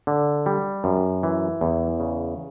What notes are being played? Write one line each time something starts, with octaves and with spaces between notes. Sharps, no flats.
D3
G3
F#2
E3
E2
C#3